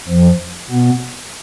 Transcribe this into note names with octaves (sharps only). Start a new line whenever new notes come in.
F2 F3
B2 B3